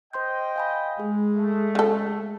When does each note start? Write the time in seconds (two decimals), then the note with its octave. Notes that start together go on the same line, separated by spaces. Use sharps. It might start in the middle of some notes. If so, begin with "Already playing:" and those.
0.13 C5 D#5 G5 C6 G6
0.56 F5 G#5 B5
1.00 G#3 G#4
1.34 A3
1.75 C#3 A4